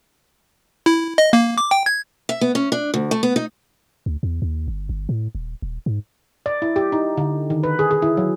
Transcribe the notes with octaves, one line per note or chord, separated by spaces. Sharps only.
E4
D#5
A#3
D6
G5
G#6
E5
B3
C#4
D4
D2
A3
B3
D#4
D2
E2
D#2
G1
G1
A2
D#1
D#1
G#2
D5
E4
G4
D#4
D3
D#3
B4
G#4
G#4
E4
F#3